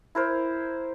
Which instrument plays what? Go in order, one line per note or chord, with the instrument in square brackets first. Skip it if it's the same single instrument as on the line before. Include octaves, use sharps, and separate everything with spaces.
[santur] E4 A#4 C5